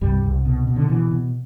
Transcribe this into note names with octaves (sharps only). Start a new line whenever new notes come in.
C2 G2 G3
C2
B2
B2
D3
B2 E3
B2